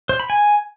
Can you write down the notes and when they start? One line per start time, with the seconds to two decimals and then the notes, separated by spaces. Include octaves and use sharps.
0.09 C5
0.20 B5
0.30 G#5